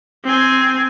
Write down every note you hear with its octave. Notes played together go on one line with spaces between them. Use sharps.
C4 G#5